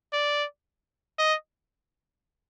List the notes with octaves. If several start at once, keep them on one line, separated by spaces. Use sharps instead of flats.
D5
D#5